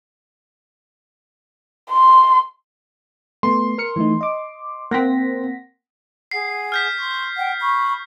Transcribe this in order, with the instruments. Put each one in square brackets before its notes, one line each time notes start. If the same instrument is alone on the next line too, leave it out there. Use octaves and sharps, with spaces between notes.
[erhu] C6
[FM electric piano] A3 B3 [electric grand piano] C6
[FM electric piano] A#4 F6 C#7
E3 A3 D#4
D#5 D6
[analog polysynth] A#3 C4 [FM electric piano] F#5 A#6 B6
[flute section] G#4 F#5 [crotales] C7
[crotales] F6 G6 B6
[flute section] C6 C#6
F#5 G5
B5 C#6